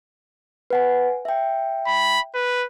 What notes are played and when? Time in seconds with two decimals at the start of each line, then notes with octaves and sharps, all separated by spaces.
0.70 B4 F#5 G#5
1.25 E5 G5
1.87 B5
2.35 B4